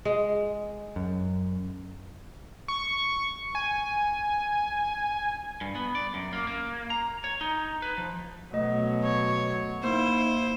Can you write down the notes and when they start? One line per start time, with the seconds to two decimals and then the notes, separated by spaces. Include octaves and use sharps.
0.05 G#3
0.96 F#2
2.68 C#6
3.55 G#5
5.61 G2
5.75 B3
5.95 D5
6.14 F#2
6.33 A#3
6.47 A#3
6.90 A#5
7.24 C#5
7.41 D#4
7.82 B4
7.97 F3
8.53 B2 F#3 A3 D#5
9.04 C#5
9.84 A#3 D#4 E4 C5